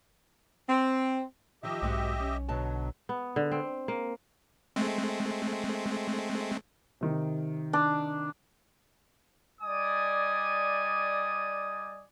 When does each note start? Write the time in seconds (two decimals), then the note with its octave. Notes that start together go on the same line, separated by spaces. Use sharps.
0.69 C4
1.63 D#3 F3 G4 D#5 E5
1.82 B1 G#2 C4 F#4
2.20 C#4
2.49 B2 D3 F#3 A5
3.09 B3
3.36 D3
3.52 C4
3.88 A#3
4.76 G#3 A3 C4
7.01 C3 D#3
7.73 D4
9.61 G3 D5 D#5 G#5 D#6